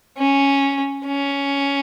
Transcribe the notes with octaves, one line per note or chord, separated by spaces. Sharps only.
C#4
C#4